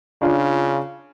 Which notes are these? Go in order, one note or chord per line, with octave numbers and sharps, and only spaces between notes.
C#3 D4 F4